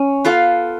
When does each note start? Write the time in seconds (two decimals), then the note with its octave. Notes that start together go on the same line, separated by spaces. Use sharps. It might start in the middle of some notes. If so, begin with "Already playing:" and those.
Already playing: C#4
0.24 B3 F4 A4 F5